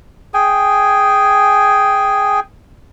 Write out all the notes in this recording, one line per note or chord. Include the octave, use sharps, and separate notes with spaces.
G#4 G5 G#5